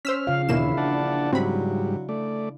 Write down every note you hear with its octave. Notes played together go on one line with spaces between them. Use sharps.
C#4 C5 E6 F6 B6
C#3 F3 F5
A#1 D#2 B2 A#3 C#4 E4 E7
D4 D5 F#5 A5
G#2 F#3 G3 C4 B5
A3 D5